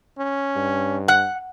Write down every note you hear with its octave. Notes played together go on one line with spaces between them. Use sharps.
C#4
G2
F#5 F#6